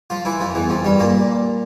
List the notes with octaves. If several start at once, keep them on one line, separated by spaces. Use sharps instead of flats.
F3 F4
E3 E4
F2 F3
E2 E3
F2 F3
G2 G3
A#2 A#3